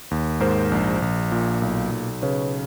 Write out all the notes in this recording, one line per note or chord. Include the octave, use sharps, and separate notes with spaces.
D#2
G#2 A#4 C5
A#1
A#1
A#2
B1
B1
C#3 B4 C#5